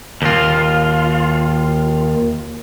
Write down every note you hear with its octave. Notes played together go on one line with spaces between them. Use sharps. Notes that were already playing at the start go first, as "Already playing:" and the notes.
D#2 F4